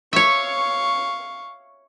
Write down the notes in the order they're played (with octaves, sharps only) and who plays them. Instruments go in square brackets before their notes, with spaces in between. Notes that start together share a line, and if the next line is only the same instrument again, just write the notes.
[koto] C#5 E5 [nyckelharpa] F5 C#6